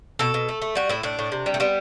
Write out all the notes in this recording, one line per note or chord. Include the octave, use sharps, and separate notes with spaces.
B2 A4
B2
A3
A3
G3 F#4
A2 E4
A2 D4
A2
C3
G3
A3
G3 B3